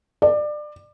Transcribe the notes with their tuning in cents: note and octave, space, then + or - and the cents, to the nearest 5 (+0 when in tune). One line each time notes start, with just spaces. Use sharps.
D5 +25